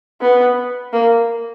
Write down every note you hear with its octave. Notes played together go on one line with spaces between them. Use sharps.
B3
A#3